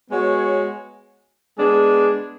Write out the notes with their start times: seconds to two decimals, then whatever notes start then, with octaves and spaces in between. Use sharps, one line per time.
0.10 G#3 B3 F#4 C#5
1.57 G#3 B3 D4 G#4